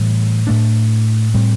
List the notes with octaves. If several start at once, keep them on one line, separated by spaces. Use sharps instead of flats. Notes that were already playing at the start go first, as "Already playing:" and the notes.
Already playing: A2 E3 G3
A2 A3 D4
A2 G3 C4